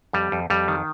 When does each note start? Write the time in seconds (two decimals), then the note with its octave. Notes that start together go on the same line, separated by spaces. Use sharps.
0.13 F2 G3
0.32 F2
0.50 F2 G3
0.68 D#3